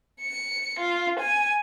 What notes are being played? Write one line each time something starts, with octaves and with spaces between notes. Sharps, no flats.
C#7
F4
G#5